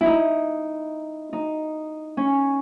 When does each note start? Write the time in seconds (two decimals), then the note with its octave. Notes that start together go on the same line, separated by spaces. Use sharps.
0.01 E4
0.06 D#4
1.33 D#4
2.17 C#4